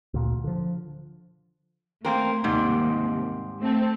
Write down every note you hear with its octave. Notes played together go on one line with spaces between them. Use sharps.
D2 A#2
D3 F3
A3 A#3 C4 A#4
D#2 G#2 C3 G3
A3 C4 A4